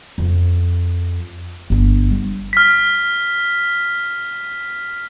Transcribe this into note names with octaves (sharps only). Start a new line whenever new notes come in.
F2
G1 D4
G3
F6 B6